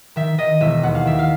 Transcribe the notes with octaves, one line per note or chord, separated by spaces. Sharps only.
D#3 E5
D#3 D#5
E1 E5
D#2 F#5
F5
D#3 E5
F5